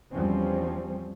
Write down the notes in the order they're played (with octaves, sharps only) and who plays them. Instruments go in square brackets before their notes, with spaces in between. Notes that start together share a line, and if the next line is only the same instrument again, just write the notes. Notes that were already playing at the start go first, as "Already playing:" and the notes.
[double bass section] E2 F3 G3 C4 C#4